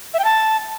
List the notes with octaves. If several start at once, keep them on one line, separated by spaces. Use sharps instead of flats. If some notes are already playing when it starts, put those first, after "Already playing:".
E5
G5
A5